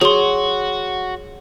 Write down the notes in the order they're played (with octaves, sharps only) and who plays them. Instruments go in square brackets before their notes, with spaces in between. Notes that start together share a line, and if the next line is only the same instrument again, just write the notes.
[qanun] F#3 [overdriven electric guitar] F#4 [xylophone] G#4 C6